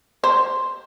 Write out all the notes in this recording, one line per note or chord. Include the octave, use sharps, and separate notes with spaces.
C5